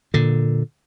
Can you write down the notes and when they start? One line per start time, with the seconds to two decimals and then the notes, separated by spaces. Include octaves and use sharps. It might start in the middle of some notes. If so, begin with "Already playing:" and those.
0.14 A#2 D3